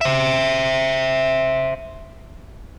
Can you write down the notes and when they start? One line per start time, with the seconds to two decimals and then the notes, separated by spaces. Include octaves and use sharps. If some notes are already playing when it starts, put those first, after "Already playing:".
0.01 C5 E5